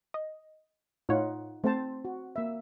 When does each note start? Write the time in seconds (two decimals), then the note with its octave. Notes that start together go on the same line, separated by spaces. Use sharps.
0.14 D#5
1.09 A2 D#4 F4 C#5 F#5
1.64 A3 C4 C5 A5
2.05 F#4
2.36 A#3 E5